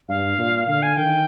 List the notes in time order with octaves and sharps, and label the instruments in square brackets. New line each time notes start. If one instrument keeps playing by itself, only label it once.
[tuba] G2 [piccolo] F5
[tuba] A#2
[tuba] D3 [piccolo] F5
[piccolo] G#5
[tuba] D#3 [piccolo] G5